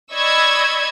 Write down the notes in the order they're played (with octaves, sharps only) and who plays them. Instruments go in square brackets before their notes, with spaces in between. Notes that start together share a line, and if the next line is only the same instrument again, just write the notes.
[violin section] D5 D#5 B5 C#6 E6 G#6